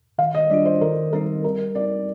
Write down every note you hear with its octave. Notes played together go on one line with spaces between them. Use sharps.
D#3 F5
D#5
G3 D4 F4 D5
C5
D#3 A#4
G3 C4 D#4 A#4
G3 A#4
C4 D#4 D5